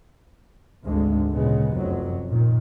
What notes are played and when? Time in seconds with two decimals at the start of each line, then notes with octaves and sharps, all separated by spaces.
0.85 G#1 D2 D3 G#3
1.32 A#2 C#3 G#3 B3
1.72 F1 F#2 F#3
2.28 A#2 D#3